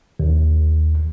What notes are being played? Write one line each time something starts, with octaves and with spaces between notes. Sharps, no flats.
D#2